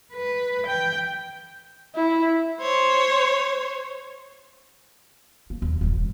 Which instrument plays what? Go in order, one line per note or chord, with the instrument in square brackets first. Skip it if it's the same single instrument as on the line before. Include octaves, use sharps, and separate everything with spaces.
[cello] B4
G5
[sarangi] E4
[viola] C5 C#5
[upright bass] A#3
D#2
D#1 G2
C3